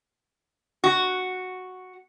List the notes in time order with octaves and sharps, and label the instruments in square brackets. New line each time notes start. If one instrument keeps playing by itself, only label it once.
[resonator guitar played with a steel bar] F#4